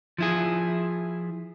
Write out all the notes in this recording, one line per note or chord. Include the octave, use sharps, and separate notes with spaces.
F3 E4 G#4